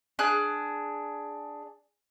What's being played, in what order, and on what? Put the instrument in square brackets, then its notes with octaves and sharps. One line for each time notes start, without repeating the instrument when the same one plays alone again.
[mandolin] D4 G#4 F6 F#6